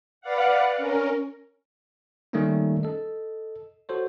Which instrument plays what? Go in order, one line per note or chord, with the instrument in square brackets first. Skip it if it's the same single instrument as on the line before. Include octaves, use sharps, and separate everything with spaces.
[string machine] B4 D5 F5 F#5
C#4 A#4
[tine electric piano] D#3 G3 A3 A#3 C#4 D#4
A4 D#5
F#4 A4 C5 C#5